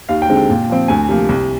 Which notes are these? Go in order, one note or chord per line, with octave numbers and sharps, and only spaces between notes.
D#2 F5
G5
D3 G#3 C4
G5
A#2
F3 C4
D2 G#5
C3 F3 A#3
C2